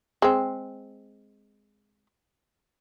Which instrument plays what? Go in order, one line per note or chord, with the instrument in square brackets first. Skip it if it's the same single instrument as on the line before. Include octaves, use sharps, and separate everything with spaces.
[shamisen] G#3 C4